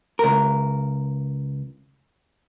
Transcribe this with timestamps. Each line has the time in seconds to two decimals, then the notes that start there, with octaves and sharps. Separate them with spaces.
0.19 C#2 A#4